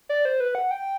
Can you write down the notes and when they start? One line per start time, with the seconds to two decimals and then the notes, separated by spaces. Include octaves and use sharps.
0.09 D5
0.25 C5
0.40 B4
0.55 F#5
0.71 G5